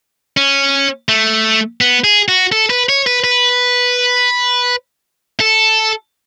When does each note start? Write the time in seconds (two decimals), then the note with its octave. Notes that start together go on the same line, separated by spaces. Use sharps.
0.37 C#4
1.09 A3
1.81 B3
2.04 G#4
2.28 F#4
2.52 A4
2.70 B4
2.89 C#5
3.06 B4
3.24 B4
5.40 A4